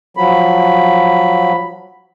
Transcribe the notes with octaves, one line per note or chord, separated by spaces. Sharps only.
F3 F#3 B5